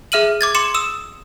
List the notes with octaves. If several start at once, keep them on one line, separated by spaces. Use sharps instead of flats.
G#4 E5 F6 D#7 F#7
D6 G#6 A6
C6 D6 C#7 E7
D#6 E6 E7